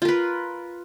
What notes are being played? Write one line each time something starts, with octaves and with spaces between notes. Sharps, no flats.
F4 A#4 B4